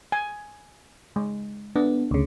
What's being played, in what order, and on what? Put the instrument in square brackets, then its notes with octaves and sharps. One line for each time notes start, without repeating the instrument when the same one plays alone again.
[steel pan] G#5
G#3
[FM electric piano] B3 [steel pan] D4
[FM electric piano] D2 C#3